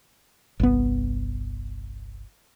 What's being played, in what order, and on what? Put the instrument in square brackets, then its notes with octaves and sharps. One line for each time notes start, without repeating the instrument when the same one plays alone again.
[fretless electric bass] G1 C2 B3